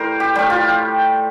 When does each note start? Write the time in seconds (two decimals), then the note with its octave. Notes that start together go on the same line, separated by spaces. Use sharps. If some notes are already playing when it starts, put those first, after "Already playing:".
Already playing: A2 E3 G3 A#4 C5
0.20 G4
0.35 A2 G3 G4
0.50 F4